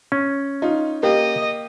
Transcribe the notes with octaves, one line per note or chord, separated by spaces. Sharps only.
C#4
D#4 F4
A#3 G4 D#5